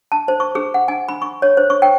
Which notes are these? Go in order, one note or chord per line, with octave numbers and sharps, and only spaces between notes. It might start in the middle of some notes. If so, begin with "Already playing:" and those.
A5
C5
C#6
G#4
F#5
G#5
B5
C#6
C#5
C5
C#6
G5